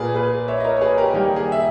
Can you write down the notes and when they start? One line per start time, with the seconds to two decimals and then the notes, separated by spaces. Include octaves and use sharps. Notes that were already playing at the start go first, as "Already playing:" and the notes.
Already playing: A#2 A#3 G#4 B4
0.15 G#4 B4
0.48 C#5 E5
0.60 D#5
0.64 A#4 C#5
0.77 C#5
0.81 G#4 B4
0.98 G4 A#4
1.14 D#3 G3 A#3 G4
1.36 G#4
1.52 E5